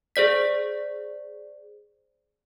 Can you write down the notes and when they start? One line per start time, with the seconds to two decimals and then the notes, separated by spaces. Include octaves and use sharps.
0.16 G#4 C5 D5 B6